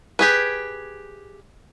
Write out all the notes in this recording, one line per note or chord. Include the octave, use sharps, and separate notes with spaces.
G4 G#4 B4